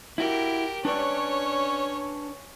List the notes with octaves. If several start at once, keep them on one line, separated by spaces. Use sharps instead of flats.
E4 F#4 G4 A#4
C#4 D4 B4 C#5 D5